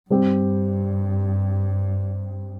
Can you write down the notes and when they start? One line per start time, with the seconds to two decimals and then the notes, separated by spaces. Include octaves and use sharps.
0.10 G2 G3 C4 G4